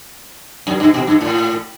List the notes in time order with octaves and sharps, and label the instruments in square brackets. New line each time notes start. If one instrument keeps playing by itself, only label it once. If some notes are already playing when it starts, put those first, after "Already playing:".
[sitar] F#2
G2
B2
G2
A2